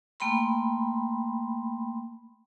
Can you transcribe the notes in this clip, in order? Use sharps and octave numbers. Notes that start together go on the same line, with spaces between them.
A3 A#3 G5 B5 C6